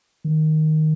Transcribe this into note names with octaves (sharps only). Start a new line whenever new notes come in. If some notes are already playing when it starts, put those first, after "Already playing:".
D#3